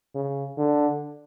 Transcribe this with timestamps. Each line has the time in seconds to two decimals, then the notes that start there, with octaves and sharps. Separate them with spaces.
0.15 C#3
0.57 D3